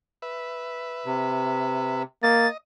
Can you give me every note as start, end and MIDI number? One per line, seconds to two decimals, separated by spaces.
0.22 2.03 71
0.22 2.03 76
1.06 2.03 48
2.23 2.47 58
2.23 2.57 75
2.23 2.48 93